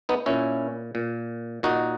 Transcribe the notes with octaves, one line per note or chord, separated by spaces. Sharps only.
B3 D#4
A#2 C#4 E4
A#2
A#2 D#4 F#4